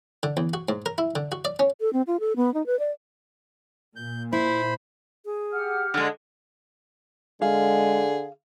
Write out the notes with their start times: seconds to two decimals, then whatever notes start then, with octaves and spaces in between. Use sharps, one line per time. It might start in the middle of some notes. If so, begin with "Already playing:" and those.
0.23 D3
0.37 E2
0.54 F#4
0.69 G#2
0.86 A#4
0.98 E4
1.16 D3
1.32 F#4
1.45 D5
1.59 C#4
1.81 A4
1.93 C4
2.07 F4
2.20 A4
2.36 B3
2.54 D#4
2.66 B4
2.79 D5
3.96 A#2 G6
4.33 E4 C5 B5
5.25 G#4
5.52 G4 F#5 F6
5.94 D3 G#3
7.42 D3 G#3 G#4 F5